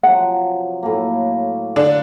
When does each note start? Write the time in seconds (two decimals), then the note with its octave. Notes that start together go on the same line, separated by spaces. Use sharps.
0.03 C3 F3 F#3 F#5
0.83 A2 F#3 A#3
1.76 D3 D4